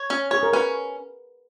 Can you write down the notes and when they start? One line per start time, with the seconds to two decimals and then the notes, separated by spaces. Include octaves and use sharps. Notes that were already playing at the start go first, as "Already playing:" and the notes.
Already playing: C#5
0.10 C#4
0.31 G#4 C#5
0.43 A#4
0.53 C#4 B4